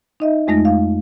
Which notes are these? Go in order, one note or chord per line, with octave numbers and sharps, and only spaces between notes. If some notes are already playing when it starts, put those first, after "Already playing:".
D#4 D#5 E5
F2 G#3 A3 D#4 A#6
F5